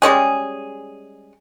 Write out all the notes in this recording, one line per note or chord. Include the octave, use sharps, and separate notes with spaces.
G3 G#3 C#4 G#4